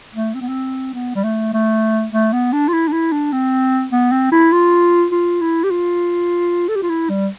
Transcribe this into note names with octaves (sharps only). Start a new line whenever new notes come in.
A3
C4
B3
C4
B3
G3
A3
A3
A3
B3
D4
F4
E4
D4
E4
D4
C4
B3
C4
E4
F4
F4
E4
G4
F4
A4
G4
F4
E4
G3